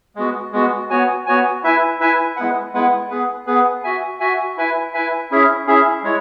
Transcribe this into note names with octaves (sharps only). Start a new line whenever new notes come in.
G#3 B3 F#4
G#3 B3 F#4
B3 F#4 C#5 G#5
B3 F#4 C#5 G#5
E4 B4 E5 G#5
E4 B4 E5 G#5
G#3 B3 E4 B4 F#5
G#3 B3 E4 B4 F#5
B3 G#4 B4
B3 G#4 B4
F#4 E5 G#5
F#4 E5 G#5
E4 B4 E5 G#5
E4 B4 E5 G#5
C#4 E4 G#4 E5
C#4 E4 G#4 E5
G#3 E4 C#5